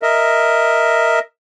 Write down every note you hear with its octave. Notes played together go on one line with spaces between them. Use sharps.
A#4 D#5 E5